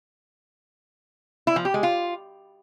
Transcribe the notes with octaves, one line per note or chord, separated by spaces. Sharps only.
E4
F3
G4
G#3
F4